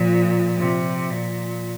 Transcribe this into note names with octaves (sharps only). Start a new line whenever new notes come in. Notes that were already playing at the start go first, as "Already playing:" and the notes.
Already playing: A#2 F3
C3
A#2